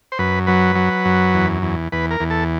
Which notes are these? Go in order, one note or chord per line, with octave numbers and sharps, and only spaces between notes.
C5
F#2 B4
F#3 B4
F#3
F#2
E2
E2
E2 B4
A#4
E2
A4